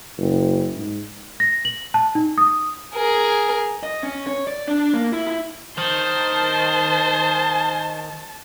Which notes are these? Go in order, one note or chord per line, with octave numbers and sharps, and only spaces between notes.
F#1
G#2
A#6
F#7
A5
D#4
D#6
G#4 A#4
D#5
C#4
C#5
D5
D4
A#3
E4
E4
D#3 C5 A5